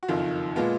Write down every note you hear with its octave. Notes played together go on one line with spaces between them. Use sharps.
F#4
F#1 F2 D#3 F4
A#2 G#3 B3 F4